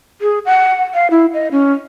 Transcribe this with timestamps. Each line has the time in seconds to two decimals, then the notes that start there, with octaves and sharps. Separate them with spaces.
0.21 G#4
0.46 F#5
0.94 F5
1.11 E4
1.34 D#5
1.52 C#4